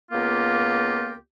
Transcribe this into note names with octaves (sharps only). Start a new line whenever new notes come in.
C#2 A#3 B3 F4 G4 A#4